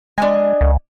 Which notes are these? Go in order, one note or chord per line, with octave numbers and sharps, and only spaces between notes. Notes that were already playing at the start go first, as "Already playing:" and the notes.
G#3 D4 D#5 G#5
C#2